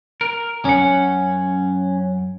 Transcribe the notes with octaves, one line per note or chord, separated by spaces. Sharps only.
A#4
F#2 C#4 F#5